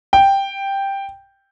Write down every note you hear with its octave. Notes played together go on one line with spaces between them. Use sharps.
G5